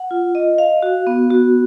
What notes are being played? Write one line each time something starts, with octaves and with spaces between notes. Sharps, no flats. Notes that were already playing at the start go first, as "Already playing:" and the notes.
Already playing: F#5
F4
D#5
F5
F#4
B3
F#4